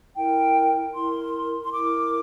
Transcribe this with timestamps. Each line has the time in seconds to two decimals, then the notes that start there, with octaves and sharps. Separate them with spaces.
0.15 E4 A#4 G5
0.94 E4 A#4 C6
1.64 C6
1.72 E4 A#4 D6